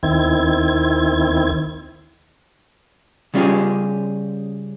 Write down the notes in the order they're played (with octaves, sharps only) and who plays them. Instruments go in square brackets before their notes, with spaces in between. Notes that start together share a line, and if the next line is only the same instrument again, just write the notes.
[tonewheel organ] D#2 D#3 C4 E4 G#6
[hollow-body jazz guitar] C#3 G3 C#4 F4 G4 G#4